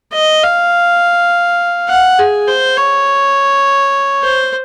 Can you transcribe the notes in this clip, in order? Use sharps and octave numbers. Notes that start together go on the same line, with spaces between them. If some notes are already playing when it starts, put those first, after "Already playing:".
D#5
F5
F#5
G#4
C5
C#5
C5